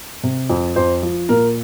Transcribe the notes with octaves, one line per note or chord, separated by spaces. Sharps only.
C3
F2
F2 C5
F3
A#2 A#4